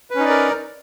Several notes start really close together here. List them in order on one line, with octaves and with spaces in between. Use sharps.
B4 C#4 D#4 D5 A#4